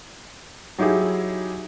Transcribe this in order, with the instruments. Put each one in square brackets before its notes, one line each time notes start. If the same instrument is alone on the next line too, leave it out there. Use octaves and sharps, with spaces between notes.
[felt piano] F#3 D#4 E4 G4 G#4